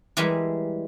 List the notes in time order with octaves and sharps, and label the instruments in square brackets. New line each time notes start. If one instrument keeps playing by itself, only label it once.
[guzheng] E3 G3 G#3 G4 A#4